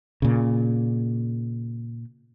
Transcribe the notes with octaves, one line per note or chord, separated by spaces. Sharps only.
A#2 C#3